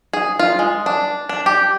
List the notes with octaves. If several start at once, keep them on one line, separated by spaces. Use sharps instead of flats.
G#4
F4
G#3
D4
D4
G4